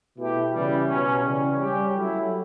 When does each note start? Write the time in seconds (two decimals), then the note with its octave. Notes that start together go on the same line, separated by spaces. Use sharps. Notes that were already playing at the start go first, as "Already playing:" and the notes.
0.16 B2 A3 E4 G4
0.52 C#3 E3 G3
0.88 B2 F#3 C#4
1.23 C#3 E3 G3 C#4
1.59 G3 C#4 G4
1.95 F#3 A3 E4